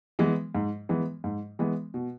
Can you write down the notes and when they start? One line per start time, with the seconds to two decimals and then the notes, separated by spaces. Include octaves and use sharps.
0.19 E3 G#3 B3
0.55 G#2
0.89 E3 G#3 B3
1.24 G#2
1.59 E3 G#3 B3
1.94 B2